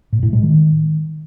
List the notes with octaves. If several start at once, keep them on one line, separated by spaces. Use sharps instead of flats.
A2
A2
G#3
D#3